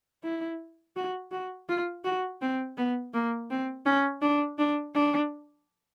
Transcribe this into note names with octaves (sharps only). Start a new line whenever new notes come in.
E4
F#4
F#4
F4
F#4
C4
B3
A#3
C4
C#4
D4
D4
D4